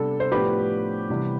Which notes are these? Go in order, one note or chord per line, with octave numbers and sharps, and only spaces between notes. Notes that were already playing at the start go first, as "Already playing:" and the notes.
Already playing: C3 G3 B3 D4 A4
C5
A2 F3 B3 D4 G4 B4
C3 E3 G3 B3